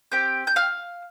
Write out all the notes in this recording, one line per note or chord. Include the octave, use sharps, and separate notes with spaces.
C4 G4 G5 G6
G6
F5 F6